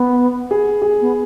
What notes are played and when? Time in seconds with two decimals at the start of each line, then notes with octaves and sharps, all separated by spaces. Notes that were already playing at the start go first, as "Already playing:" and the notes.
Already playing: B3
0.51 G#4
0.82 G#4
1.01 B3